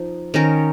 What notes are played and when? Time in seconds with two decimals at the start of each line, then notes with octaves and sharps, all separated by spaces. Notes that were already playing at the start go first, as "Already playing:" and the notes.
Already playing: F3 D#4
0.34 D#3 C#4 A#4